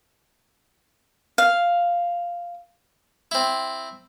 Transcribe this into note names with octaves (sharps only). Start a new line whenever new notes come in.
F5
C4 E4